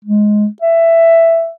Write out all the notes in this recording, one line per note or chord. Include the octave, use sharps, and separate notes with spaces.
G#3
E5